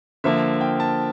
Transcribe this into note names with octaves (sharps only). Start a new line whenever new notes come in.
D3 F3 A#3 E5
G5
A5